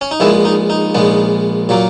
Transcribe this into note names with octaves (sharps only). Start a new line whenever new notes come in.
C#4
D#4
A#1 A#2 G#3 B3 E4
D#4
D#4
A#1 A#2 G#3 B3
A#2 F#3 A#3